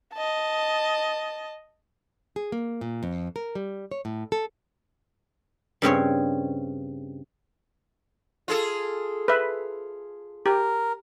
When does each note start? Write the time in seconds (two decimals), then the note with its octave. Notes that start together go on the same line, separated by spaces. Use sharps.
0.14 D#5 A5
2.36 G#4
2.52 A#3
2.81 A#2
3.03 F2
3.36 A#4
3.55 G3
3.91 C#5
4.05 A2
4.32 A4
5.82 G2 C#3 C4 C#5
8.48 F4 G#4 A4
9.28 B4 E5
10.46 G4 A#4